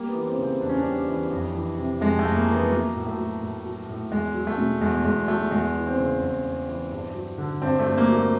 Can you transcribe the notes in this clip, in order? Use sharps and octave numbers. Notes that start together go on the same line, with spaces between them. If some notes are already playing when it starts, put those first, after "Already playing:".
Already playing: G3 A#3
B3
E3
C4
C#3
C4
E2 D4
C#4
D4
G3
E3
F2
E3
C3
F2 G#3
A3
F2
A#3
E3
B3
F#3 A#3
A2
A3
F#3
A2
F#3
A2
E2 G#3
F#3
A3
B2
E2 G#3
E2 G#3
F#3 A3
E2 G#3
E3
C4
C#3
E2
E2
E3
G2
F#3
D3
G2 C4
A3
G2
A#3
F#3
A3